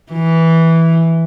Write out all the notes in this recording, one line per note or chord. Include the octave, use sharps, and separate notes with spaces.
E3